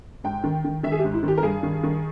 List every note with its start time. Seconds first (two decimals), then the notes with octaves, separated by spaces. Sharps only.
0.24 G#2 G5
0.44 D#3
0.64 D#3
0.83 D#3 E5
0.92 G#4
0.99 G4
1.04 G#2
1.14 E4
1.23 D#3 G4
1.38 A#4
1.43 G2 G#4
1.63 D#3
1.83 D#3